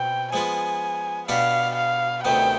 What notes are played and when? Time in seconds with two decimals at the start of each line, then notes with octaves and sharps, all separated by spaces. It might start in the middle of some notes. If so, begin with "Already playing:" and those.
Already playing: B2 C4 G5
0.33 F3 G#3 B3 F4 G#5
1.28 B2 B3 D4 G4 F5
1.76 F5
2.24 D2 C3 D#3 B3 G5